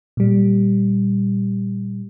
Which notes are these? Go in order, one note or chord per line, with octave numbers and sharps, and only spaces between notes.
A#2 G3